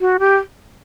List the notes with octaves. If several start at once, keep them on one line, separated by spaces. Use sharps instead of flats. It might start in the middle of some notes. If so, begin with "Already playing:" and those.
F#4
G4